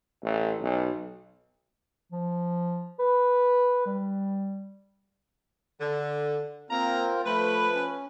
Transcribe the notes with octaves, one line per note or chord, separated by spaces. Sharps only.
A1
B1
F3
B4
G3
D3
A#3 C4 F4 A#4 A#5
F3 A3 B4
C#4